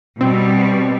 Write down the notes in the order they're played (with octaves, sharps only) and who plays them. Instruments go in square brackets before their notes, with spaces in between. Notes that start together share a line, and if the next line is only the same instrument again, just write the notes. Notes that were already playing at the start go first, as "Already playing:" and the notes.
[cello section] B2 G3 [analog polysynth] C4